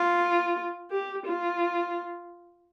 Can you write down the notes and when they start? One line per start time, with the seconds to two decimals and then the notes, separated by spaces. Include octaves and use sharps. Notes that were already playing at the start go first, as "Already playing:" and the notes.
Already playing: F4
0.91 G4
1.26 F4